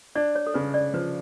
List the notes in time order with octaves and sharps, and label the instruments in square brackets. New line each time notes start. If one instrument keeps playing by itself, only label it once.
[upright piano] D4 [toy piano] D5
[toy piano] C#5
A4
[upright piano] C#3 [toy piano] B4
[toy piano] D5
[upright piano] F3 [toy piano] B4